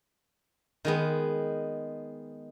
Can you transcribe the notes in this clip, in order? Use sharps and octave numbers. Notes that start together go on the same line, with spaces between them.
D#3 G#3 B3